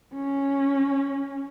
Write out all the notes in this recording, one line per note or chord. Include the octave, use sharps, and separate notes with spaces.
C#4